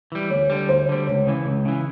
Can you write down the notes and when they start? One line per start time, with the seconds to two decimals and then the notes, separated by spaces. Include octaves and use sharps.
0.12 E3 G3
0.30 D2 C#5
0.50 D3 G3
0.69 D2 C5
0.89 D3 G3
1.07 C#2 C#5
1.27 C#3 E3
1.46 C#2
1.65 C#3 E3